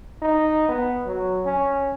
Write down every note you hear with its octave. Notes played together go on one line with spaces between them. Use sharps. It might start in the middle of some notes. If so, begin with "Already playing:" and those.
D#4
B3
F#3
C#4